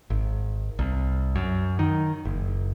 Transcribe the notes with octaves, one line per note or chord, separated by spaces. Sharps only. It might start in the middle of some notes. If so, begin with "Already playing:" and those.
G#1
C2
F#2
D#3
F#1